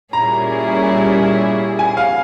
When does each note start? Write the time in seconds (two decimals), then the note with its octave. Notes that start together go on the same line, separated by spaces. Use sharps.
0.13 A#2 G3 C#4 E4 G#4 A#5
1.79 G#5
1.97 F5